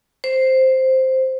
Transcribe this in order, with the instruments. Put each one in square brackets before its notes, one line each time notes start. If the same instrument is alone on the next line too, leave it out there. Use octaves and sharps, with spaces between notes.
[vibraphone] C5